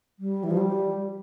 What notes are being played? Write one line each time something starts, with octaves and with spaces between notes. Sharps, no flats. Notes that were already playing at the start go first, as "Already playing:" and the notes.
G3
E3
F3
G3